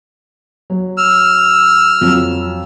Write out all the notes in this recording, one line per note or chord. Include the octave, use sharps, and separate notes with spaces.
F#3
E6 F6
F2 F#3